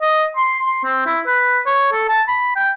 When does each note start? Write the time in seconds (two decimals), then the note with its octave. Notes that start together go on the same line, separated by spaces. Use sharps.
0.02 D#5
0.36 C6
0.66 C6
0.84 C4
1.06 E4
1.27 B4
1.66 C#5
1.92 A4
2.08 A5
2.28 B5
2.56 G5